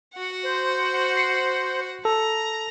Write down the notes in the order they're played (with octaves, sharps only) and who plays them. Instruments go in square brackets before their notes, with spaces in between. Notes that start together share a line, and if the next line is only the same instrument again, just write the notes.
[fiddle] F#4 F#5
[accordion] C5
[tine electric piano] C7 C#7
[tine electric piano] A4 [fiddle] A#5